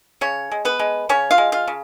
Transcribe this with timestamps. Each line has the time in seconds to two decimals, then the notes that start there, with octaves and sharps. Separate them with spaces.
0.21 C#3 C#4 C#5
0.52 G#3
0.65 B3 B4
0.79 G#3
1.09 C#3 C#4 C#5
1.31 F4 F5
1.38 G#3
1.52 F4 F5
1.67 C#3